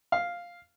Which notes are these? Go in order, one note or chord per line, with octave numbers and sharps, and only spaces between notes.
F5